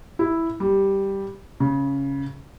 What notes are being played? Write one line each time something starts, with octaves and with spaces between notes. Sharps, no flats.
E4
G3
C#3